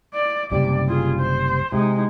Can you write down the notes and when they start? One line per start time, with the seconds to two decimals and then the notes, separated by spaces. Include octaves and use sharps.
0.14 D5
0.52 F#1 C3 G3 D5
0.88 F4 G#4
1.19 C5
1.72 C3 G#3 D#4